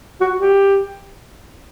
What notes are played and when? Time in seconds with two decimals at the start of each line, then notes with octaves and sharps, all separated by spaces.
0.21 F#4
0.39 G4